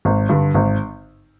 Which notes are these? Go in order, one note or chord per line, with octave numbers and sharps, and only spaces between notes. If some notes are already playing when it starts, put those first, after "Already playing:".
G#1
G2 D3
G#1